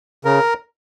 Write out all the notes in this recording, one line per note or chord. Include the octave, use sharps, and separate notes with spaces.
C#3 A#4